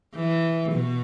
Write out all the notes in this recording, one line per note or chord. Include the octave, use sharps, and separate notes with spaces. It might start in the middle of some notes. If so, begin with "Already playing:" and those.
E3
B2